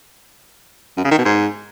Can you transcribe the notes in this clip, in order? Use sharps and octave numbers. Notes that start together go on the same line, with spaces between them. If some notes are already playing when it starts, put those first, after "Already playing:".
F#2
C#3
D#3
B2
G#2